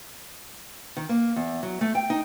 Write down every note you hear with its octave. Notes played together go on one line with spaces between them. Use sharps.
D#3
A#3
E2
F#3
A3
G5
D#4